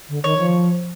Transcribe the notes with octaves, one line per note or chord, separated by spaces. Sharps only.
D3
D#3 C#5
F3